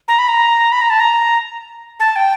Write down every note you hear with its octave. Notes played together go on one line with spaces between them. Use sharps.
A#5
B5
A#5
B5
A#5
A5
A#5
A5
G5